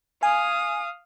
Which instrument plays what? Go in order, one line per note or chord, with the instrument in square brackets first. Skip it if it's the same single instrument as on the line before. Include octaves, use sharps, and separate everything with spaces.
[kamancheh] F5 D#6 [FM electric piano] G#5